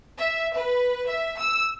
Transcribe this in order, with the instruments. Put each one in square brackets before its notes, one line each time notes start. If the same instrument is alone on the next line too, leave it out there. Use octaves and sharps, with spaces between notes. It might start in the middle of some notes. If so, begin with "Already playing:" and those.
[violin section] E5
B4
E5
E6